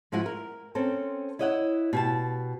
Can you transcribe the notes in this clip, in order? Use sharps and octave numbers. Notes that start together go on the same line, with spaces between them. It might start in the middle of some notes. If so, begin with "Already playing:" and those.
G#2 F3 G#3 E4 F#4 F#5
A#4
C4 C#4 A4 A#4 C5
E4 C#5 D#5 E5 F#5
B2 G4 A5